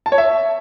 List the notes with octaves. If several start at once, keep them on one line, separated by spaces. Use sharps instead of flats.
A5
C#5
E5